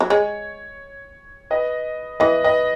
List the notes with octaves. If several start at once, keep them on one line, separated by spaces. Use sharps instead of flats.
F#3
G#3 C#5
B4 D#5
E3 B4 D#5
B4 D#5